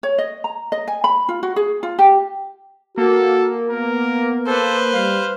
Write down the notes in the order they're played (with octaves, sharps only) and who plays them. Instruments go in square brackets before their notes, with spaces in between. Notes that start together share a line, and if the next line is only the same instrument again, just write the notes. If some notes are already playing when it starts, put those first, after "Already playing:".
[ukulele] C#5
D#5
A#5
D#5
G#5
B5
F4
F#4
G#4
F4
G4
[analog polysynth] A#3 [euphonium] F#4 [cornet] A4
[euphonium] B3 [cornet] A#4
[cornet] A4 [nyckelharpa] B4 C5
[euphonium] G3 [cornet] F5